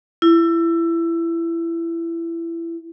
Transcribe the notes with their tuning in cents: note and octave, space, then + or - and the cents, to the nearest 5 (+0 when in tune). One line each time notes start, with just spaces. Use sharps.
E4 +20